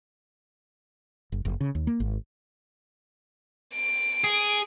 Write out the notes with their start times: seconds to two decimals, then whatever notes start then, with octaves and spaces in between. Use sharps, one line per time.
1.32 F#1
1.45 F#1
1.60 C#3
1.75 D#2
1.87 A#3
2.00 G#1
3.75 D7
4.24 G#4